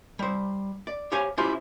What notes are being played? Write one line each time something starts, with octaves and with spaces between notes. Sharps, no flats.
G3 C5
D5
G4 C5 C#5 F5 G#5
C#4 E4 F4 G4 C5